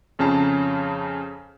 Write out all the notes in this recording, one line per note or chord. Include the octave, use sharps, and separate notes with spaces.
F2 C#3 C#4 A5 A#5 C7